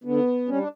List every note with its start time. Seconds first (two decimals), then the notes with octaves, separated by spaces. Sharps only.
0.04 D3 B3
0.48 G3 C#4
0.58 D4